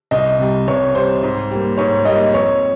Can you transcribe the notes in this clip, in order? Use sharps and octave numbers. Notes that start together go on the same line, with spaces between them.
C2 D#5
C3 G3
C2 C#5
C3 G3 C5
G#2
G3 A#3
G#2 C#5
G3 A#3 D#5
F2 C#5